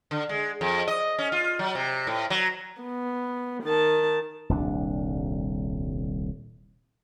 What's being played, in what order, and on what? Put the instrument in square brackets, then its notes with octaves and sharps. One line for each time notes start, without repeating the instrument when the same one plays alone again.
[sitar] D3
G#3
F2
D#5
C#4
F4
F#3
C3
A2
F#3
[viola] B3
D#3 A5
[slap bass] D#1 C2 D4